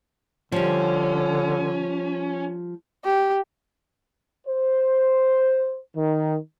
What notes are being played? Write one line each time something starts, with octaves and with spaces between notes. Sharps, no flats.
D3 F3 G3 C#4
G4
C5
D#3